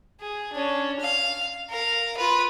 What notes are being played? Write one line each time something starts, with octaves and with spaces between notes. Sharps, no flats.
G#4
C#4 D4
F5
A#4 F5
F4 B4